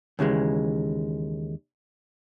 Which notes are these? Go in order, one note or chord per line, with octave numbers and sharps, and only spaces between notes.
D#2 C#3 E3 G#3